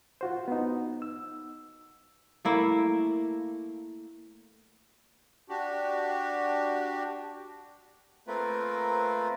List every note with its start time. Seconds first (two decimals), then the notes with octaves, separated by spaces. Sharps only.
0.21 F4 F#4 C5
0.48 B3 D#4
1.02 E6
2.45 A3 A#3 E4
5.49 D4 F#4 G4
8.27 A3 A#3 C4 F4 A#4 B4